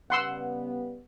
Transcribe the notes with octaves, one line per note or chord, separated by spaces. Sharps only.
C#3 G3 B3 F#5 C6 E6